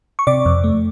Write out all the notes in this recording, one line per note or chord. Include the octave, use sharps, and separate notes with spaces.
C#6
C3 D5 D6
F2
A3